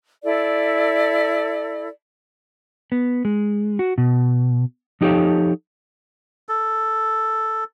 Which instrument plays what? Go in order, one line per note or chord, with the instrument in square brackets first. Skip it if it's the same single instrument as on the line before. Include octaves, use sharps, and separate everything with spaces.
[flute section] E4 A4 D5
[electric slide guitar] B3
G#3
F#4
B2
F3 D#4 G4 A4 C#5 F5
[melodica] A4